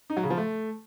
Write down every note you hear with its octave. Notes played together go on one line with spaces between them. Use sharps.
D#4
F#3
C#3
F3
A3